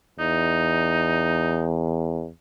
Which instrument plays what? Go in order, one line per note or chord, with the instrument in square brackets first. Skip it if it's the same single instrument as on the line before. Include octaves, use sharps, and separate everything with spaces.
[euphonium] E2 [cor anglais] D#4